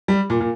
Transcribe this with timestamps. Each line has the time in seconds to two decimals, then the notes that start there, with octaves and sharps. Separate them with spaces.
0.08 G3
0.30 A#2
0.40 A#2